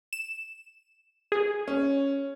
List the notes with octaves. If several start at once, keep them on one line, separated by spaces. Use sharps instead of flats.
E7
G#4
C#4